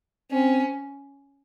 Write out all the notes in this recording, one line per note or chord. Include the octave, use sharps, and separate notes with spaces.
C4 C#4